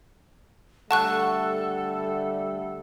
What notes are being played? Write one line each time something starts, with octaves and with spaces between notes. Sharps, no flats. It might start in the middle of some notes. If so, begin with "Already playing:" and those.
D3 G3 A3 A4 F#5 A5 C#6 F#6